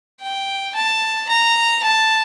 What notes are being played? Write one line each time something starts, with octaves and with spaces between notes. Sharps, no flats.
G5
A5
A#5
A5